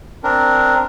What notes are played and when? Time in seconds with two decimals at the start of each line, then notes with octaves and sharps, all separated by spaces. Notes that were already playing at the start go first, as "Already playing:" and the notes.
0.24 C4 D4 A#4